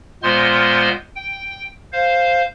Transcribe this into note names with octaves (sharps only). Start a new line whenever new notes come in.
A#2 G#3 B3 C5 C6 F6
G5
C5 F5